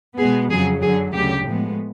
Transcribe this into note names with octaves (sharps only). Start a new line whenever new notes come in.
B2 G#3 B3 G#4
F2 C#3 F#3 G#4
F#2 D3 F#3 G#4
D2 C#3 F#3 G4
A2 F3 G#3 B3